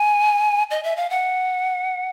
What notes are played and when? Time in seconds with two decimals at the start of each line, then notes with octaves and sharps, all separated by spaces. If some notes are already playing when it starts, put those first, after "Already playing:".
Already playing: G#5
0.71 D#5
0.83 E5
0.97 F5
1.10 F#5